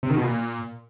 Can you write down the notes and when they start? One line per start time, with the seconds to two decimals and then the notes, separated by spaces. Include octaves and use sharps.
0.03 C3
0.10 D#3
0.17 B2
0.24 A#2